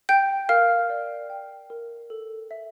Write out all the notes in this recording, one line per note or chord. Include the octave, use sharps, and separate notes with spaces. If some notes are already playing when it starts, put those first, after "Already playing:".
G5 G6
A#4 F5 F6
D5
G5
A#4
A4
E5